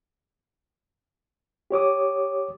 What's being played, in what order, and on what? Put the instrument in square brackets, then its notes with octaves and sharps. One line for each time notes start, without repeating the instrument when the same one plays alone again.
[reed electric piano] G4 C#5 D6 D#6